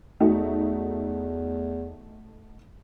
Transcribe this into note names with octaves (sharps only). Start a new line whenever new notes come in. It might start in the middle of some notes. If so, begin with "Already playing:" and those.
E2 A3 D#4 F#4